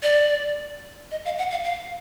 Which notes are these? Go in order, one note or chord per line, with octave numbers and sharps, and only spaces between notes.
D5
D#5
F5
F#5
F5
F5